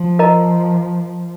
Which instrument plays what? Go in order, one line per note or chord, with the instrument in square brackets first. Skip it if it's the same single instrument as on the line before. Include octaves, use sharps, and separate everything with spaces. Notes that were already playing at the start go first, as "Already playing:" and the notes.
Already playing: [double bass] F3
[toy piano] A#4 D#5 A#5